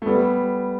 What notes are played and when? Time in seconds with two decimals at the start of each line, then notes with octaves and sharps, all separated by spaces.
0.02 A3
0.06 G3 B3